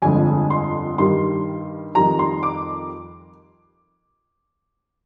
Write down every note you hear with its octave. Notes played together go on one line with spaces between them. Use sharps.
G1 F2 D3 G#3 G#5
C6
G2 D#3 G3 C6
F2 D#3 G3 A#5
C6
D6